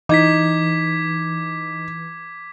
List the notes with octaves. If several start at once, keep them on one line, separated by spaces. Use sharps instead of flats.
E3 D#4 D6 G#6 B6